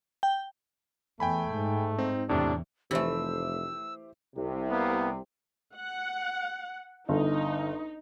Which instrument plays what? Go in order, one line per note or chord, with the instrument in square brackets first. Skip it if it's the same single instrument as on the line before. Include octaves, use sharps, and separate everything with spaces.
[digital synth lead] G5
[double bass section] E2 [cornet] A3 [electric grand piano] G5 G#5 B5
[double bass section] G#2
[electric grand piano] C4 D#4
[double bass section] E2 [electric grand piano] A2 C3 [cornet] D4
[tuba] F1 [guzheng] E3 A3 [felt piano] G4 C5 E5 [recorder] E6
[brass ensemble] C2 C3
[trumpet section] A#3 B3
[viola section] F#5
[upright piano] G1 [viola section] D#4